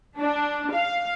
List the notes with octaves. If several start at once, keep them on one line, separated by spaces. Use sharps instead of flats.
D4
F5